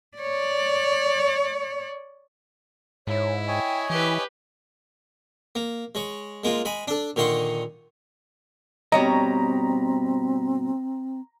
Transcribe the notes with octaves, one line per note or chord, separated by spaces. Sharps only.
C#5 D5
G#2 E4 C#5
C#5 D#5 G5 G#5
E3 E4 G4 B4
A#3
G#3 C#5
G#3 A#3 F4
G#3 G#5 B5
D4 A4
A#2 D3 D#3 C6 C#6
G2 B2 G3 C4 C#5 D#5 A#5